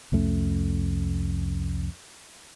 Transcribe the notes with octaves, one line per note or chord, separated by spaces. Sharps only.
C2 F2 A3 C#4